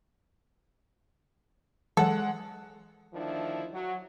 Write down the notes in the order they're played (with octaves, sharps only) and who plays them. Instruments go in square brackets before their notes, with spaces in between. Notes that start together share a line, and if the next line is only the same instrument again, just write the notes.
[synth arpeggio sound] E3 F#3 [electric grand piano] G#3 F#5 [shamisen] A4
[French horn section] D2 D#3 F3 D4 E4
F#3